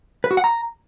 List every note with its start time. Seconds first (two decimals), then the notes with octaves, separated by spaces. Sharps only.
0.24 B4
0.31 F#4
0.37 F#5
0.44 A#5